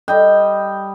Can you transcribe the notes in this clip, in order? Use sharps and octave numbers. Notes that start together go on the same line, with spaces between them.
G3 D#5 G5